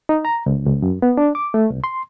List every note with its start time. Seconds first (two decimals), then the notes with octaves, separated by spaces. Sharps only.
0.09 D#4
0.25 A#5
0.46 C#2
0.67 C#2
0.82 F#2
1.02 B3
1.17 D4
1.35 D6
1.54 A3
1.70 C2
1.84 C6